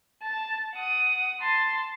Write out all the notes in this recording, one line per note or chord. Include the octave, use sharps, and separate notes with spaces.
A5
F#5 D#6
A5 C6